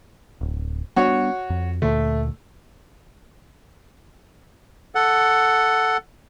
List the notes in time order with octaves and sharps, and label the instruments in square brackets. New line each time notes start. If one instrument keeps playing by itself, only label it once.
[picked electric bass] D1
[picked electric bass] G3 B3 D4 [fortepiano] F#4 C#5
[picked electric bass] F2
[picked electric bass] D2 A#2 D3 [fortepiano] A3
[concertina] A4 F#5